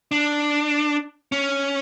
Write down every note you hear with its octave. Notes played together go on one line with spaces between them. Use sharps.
D4
C#4